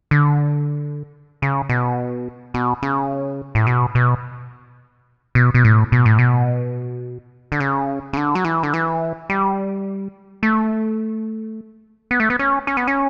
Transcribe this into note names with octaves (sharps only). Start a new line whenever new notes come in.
D3
C#3
B2
B2
C#3
A2
B2
B2
B2
B2
A2
B2
A2
B2
D3
C#3
C#3
D3
F#3
E3
D3
E3
G3
A3
B3
A3
B3
C#4
C#4
B3
C#4